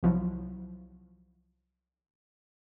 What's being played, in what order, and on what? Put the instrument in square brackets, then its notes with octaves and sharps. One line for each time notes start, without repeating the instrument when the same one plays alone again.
[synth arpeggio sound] C2 F3 F#3 E4